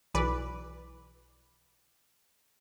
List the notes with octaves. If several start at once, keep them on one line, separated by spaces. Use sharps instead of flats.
B1 E3 B4 D5